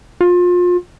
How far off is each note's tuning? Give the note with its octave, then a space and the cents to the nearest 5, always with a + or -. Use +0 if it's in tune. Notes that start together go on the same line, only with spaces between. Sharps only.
F4 +30